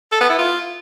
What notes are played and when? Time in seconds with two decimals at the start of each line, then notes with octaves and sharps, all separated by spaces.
0.12 A4
0.21 B3
0.30 E4
0.39 F4